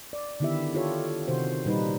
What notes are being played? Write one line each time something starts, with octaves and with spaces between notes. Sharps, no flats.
D5
D3 D#3 B3 E4 G4 E5
F4 G4 A4 C#5
C3 D#3 F#4 C5
A#2 G3 D#4 B4